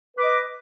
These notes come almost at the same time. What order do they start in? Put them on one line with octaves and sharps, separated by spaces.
B4 D6 D#5